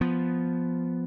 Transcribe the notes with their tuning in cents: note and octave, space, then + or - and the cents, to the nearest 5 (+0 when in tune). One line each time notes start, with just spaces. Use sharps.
F3 +0 B3 +0